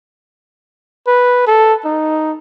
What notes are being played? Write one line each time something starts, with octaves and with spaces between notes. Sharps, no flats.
B4
A4
D#4